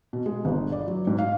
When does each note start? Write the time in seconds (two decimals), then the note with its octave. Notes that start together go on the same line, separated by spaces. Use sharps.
0.13 B2
0.26 G#3
0.45 G1
0.72 D5
0.88 F#3
1.07 G#2
1.18 F5